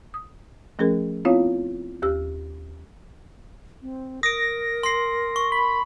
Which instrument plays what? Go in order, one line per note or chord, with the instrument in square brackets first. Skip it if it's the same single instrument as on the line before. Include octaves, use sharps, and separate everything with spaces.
[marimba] D#6
F3 A3 C#4 G#4 A#4
B3 C4 E4 F4 C#5 F5
D#2 G4 E6
[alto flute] C4
[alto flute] A#4 [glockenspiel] D#6 D7 [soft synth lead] A#6
[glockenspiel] C6 C7
C#6
[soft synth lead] B5